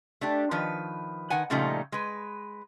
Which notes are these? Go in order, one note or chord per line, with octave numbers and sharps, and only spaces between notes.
A3 D4 G4
D#3 F3 B4
D#3 B4 F#5 G#5
A#2 C#3 F3 G3 A3 D#4
G#3 B4